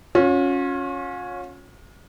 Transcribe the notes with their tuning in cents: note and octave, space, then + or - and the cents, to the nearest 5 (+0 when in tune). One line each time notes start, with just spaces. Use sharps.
C#4 +0 F4 +45